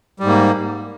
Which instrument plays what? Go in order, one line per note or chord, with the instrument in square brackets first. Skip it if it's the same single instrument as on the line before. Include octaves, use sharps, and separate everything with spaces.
[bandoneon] G3
G#2
A#3